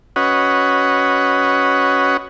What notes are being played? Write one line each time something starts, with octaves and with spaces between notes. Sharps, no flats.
C#4 F#4 B4 C#5 D#5 F#5